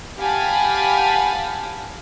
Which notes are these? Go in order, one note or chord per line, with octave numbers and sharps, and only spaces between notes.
G4 F5 F#5 G#5 A5 B5